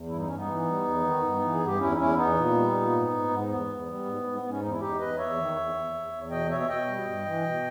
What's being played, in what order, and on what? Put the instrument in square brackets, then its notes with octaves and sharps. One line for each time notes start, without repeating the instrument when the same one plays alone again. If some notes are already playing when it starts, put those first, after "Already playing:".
Already playing: [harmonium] E2
G2 E4
D#4
G2 C#4
B3 D#4
E3
G3
E2
D#3
G2
E3
G#4
G2
G4
E2 C#4 E4
D#4
E2 C#4 E4
E2 B3 D#4
A#2
G3
A#2
G#2
G#2
G#2
E2 B3
E2
G3
G#2
G#2
G#2 B3
C#4
E2 D#4
E4
E2 D#4 G4
E2 B4 D#5
E2 C#5 E5
D#3
E2
E2
E2
E2
B2 D#5 G5
B2 C#5 E5
E5
B2 D#5 G5
G3
G2
E3
B2